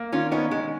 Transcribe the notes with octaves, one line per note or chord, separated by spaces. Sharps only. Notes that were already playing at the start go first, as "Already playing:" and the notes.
Already playing: A#3
D#3 C#4 F4
B3 C#4 D#4
D#3 G#3